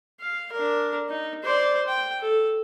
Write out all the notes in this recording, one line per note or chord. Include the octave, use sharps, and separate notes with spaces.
F5
D4 A#4
D#4
C5 D5
G5
A4